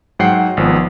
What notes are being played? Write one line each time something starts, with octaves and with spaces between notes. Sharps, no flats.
G#2 F#3 F#5 G5 C7
G#1 F3 B3